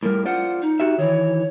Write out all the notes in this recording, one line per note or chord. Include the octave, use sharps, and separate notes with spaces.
A2 G3 A#4
F4 C5 D5 F#5
D#4
F#4 G4 E5
D#3 E3 C#5